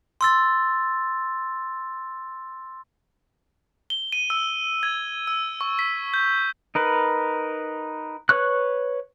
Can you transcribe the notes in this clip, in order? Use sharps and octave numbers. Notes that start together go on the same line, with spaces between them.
C6 E6 A6
G7
D#7
E6
G#6
E6
C#6
B6
G6
D#4 A#4 B4
B4 C#5 C#6 F#6